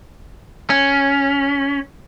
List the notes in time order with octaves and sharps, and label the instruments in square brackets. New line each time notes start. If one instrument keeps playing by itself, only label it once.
[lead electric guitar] C#4